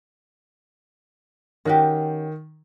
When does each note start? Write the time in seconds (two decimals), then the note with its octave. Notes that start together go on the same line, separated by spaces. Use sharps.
1.65 D#3 C#4 F#4 G4